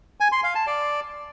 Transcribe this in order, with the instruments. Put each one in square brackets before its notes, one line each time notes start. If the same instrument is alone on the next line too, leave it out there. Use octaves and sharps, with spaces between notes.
[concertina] G#5
C6
F5
A5
D5